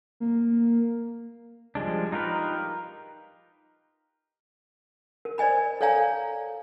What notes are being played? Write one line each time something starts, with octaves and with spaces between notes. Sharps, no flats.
A#3
F3 G3 G#3 D4
D#4 F4 G4 A#4 B4
A#4
C5 D5 D#5 G#5 B5
A4 C#5 D5 F5 G#5 A#5